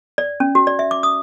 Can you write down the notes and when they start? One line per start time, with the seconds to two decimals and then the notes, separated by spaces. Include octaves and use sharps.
0.18 D5
0.40 C#4
0.55 F#4
0.67 D5
0.79 E5
0.91 D6
1.03 D#6